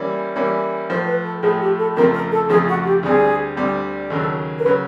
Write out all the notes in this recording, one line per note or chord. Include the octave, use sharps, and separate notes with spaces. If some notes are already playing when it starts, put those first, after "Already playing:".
Already playing: E3 G3 A#3 C#4
E3 G3 A#3 C#4
A2 F3 A3 C5
B4
A4
A2 F3 A3 G#4
G4
A4
F2 C#3 F3 A3 C4 A#4
A#4
A4
F2 C#3 F3 A3 C4 G#4
F#4
G4
D2 D3 G3 C4 G#4
D2 D3 G3 C4
D#2 C#3 F#3 A4
A#4
B4
C#3 F#3